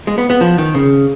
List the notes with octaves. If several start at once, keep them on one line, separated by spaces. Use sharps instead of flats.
G#3
B3
B3
F3
D#3
C#3